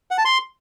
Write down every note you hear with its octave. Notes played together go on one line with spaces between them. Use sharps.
F#5
A5
C6